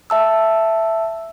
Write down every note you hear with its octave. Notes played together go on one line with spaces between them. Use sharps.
E5 A5 E6